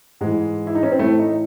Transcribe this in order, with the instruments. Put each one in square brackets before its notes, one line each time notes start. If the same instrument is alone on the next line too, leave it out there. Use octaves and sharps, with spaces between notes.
[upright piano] G#2 E3 G#3
E4
D#4
C#4
C4
A2 E3 A3
D#4